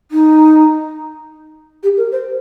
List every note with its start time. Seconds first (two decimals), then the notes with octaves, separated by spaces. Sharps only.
0.11 D#4
1.83 G4
1.97 A#4
2.12 C5